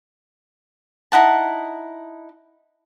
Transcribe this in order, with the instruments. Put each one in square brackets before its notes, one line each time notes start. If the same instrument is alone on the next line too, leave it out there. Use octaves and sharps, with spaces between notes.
[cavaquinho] D#4 E4 F#5 A5